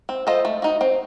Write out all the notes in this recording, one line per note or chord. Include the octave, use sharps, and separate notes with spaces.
C4
F4 A4 C5 D#5
A3
D#4 F#4
C4